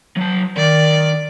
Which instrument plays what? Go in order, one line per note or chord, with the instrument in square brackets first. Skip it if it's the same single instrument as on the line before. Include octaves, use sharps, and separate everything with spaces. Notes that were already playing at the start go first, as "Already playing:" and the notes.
[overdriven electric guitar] F#3 A5
[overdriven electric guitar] D#3 [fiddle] D5